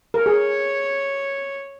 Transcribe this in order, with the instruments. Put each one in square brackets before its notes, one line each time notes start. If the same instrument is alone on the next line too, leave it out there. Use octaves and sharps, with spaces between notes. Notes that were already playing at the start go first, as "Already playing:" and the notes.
[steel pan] A#4
[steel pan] G#4 [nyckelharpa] C#5